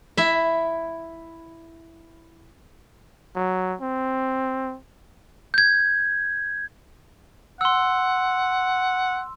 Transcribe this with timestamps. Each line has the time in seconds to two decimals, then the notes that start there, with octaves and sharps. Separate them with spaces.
0.17 E4 E5
3.35 F#3
3.81 C4
5.54 G6 G#6
7.61 F#5 C6 E6